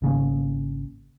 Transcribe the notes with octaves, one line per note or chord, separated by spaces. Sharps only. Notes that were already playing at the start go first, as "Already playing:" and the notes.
G#1 C#3 A#3